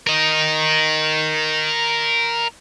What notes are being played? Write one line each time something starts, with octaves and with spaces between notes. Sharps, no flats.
A#4 D#5